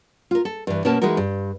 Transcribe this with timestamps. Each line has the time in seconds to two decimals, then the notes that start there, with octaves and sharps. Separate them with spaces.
0.31 F4 A#4
0.45 A4
0.67 G2 E3
0.85 B2 A#3 C#4 A#4 A5
1.02 E3 G#3 D#4 F#4 A#4
1.17 G2